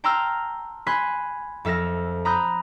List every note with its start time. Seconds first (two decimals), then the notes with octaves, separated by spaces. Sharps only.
0.04 G5 A5 A#5 C6 E6 F6
0.87 G#5 B5 C6 F#6 B6
1.65 F2 A4 E5 F6 A#6
2.25 A#5 B5 D#6 F#6 G6